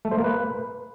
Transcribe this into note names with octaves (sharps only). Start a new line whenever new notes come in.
A3
C5
A#3
B4